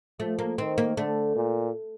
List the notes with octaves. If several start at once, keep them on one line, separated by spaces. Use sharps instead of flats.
F3 A3
A#3
D#3 C4
A#3
D3 A3
A#2